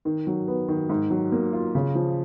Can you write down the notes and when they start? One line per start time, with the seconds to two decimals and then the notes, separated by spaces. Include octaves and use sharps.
0.05 D#3
0.27 F#3
0.48 B3
0.68 D#3
0.89 G#2
1.11 F#3
1.32 A#3
1.53 F4
1.75 C#3
1.95 F3